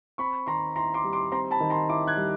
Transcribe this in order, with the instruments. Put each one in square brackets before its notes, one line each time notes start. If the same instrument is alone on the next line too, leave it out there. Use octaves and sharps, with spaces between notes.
[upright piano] C4 [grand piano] B5 C#6
[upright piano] D#3 [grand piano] A#5 C6
[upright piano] E4 [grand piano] A#5 C6
[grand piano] C6 D6
[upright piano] G3
[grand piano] C6 D6
[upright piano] C4 [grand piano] A#5 C6
[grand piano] A5 B5
[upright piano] D#3
[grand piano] A#5 C6
[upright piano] E4 [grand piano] C6 D6
[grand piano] F#6 G#6
[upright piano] G3